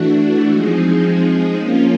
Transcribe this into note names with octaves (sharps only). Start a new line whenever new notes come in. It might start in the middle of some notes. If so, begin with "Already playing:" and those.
Already playing: E3 A3 D4 F#4
F3 G#3 C4 D#4 G#4
F3 A#3 C#4 F4